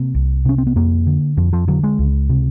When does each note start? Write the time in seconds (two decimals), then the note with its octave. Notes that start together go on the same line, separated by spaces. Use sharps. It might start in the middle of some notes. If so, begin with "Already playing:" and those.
Already playing: C3 A#3
0.15 C2
0.45 C3 C#4
0.58 C4
0.67 B3
0.76 F2 A#3
1.07 D3
1.37 F2 F3
1.53 F3
1.68 D3 F#3
1.83 G#3
1.99 C#2
2.29 C3